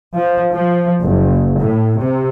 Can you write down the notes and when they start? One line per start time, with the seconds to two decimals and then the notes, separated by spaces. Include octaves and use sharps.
0.15 F3
0.53 F3
1.02 F#1
1.59 A2
1.99 C3